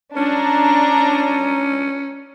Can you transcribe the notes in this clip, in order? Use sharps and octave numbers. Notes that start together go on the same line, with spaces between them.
C#4 D4 A#5